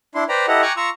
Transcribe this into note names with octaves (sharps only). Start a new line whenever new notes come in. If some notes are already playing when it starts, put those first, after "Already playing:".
D4 E4 C6
B4 C5 D5 G5 A#5 B5
E4 G4 A4 D#5 F#5 A#5
G5 G#5 A#5 C#6 D6 F#6
F4 A#5 C#6 E6